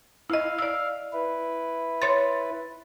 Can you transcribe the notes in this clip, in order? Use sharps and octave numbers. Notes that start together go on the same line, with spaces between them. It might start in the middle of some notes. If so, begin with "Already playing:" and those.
E4 D#5 F5
D5 E6
E4 B4
C#5 C6 A6